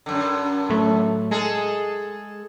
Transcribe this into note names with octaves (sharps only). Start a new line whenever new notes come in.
F#2 D3
A2 F#3 A3
G#3 G#4 A4